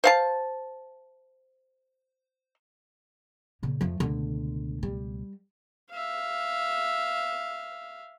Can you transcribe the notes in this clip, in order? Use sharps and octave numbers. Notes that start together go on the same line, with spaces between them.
C5 F5 A5
A#2 C#3 A#3
F2 F3 A3
C#2 B2 D3 A3
G3
E5 F5